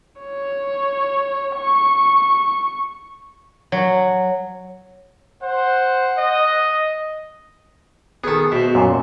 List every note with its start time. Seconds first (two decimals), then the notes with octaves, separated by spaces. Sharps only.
0.22 C#5
1.56 C#6
3.72 F#3
5.43 C5 F#5
6.18 D#5
8.24 D#3 B3 G#4 A4
8.52 B2 C5 E5
8.75 F#2 A#2